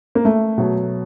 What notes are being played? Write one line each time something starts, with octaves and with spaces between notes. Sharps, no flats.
A#3
A3
B2 F#3